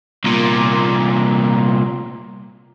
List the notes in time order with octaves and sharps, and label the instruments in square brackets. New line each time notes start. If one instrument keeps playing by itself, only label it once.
[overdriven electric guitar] C2 A#2